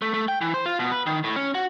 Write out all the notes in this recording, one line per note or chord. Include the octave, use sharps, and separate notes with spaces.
A3
A3
G5
E3
C5
F4
B2
B4
D#3
A2
C#4
F#4